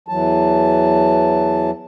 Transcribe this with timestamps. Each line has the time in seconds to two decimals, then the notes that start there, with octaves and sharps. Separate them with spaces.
0.08 E2 E3 F#3 A5